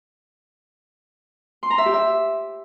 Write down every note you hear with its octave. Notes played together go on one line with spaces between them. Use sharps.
C6
A#5
E5
G4
E5